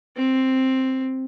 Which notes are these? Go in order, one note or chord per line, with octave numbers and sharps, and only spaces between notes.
C4